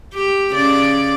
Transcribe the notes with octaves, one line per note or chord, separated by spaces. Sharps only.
G4
C#3 D5